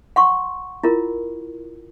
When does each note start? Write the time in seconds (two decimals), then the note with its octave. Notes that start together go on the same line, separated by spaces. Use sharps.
0.16 F#5 C6 C#6
0.84 E4 F4 A#4